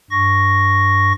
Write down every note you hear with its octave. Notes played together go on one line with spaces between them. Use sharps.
G2 C#6 A#6